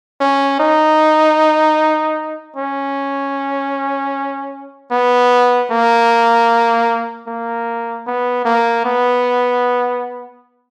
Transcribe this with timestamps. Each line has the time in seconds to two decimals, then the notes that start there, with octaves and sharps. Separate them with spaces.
0.21 C#4
0.60 D#4
2.56 C#4
4.92 B3
5.71 A#3
7.28 A#3
8.07 B3
8.45 A#3
8.85 B3